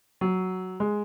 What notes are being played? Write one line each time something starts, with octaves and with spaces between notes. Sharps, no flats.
F#3
G#3